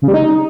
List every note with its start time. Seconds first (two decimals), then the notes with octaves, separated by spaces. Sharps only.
0.02 C#3
0.08 G3
0.14 D#4